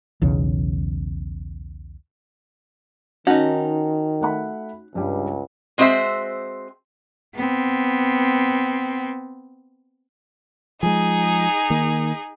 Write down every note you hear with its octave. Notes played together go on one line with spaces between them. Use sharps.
B1 E2 C#3
D#3 C#4 D#4 F#4 A5
A3 F#5 B5
C#2 G2 G3
G#3 C4 F#4 C5 E5
B3 C4
F3 G#3 D#4 G#4
D#3 A#3